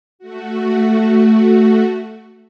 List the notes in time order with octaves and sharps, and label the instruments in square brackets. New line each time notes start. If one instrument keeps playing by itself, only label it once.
[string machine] A3 F#4